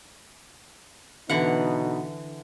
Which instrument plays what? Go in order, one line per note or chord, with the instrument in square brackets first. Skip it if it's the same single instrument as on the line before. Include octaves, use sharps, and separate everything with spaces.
[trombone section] B2 B3 D#4 [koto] D3 E3 F#5